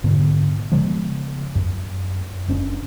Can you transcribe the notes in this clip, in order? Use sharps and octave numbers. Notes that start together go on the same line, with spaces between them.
G#2 B2 D3 B3
C#3 F3 G#3 B3
F#2
F#1 C#4 D4